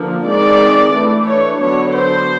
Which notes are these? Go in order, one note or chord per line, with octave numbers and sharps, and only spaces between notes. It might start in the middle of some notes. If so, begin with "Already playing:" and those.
Already playing: D3 F3 A#3 D4
D#3 G#3 C4 D5
E3 A3 D4
C#5
D3 F#3 B3 D4 C#5
C5